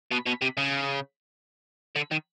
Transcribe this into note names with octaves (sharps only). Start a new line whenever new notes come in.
B2
B2
C3
C#3
D3
D#3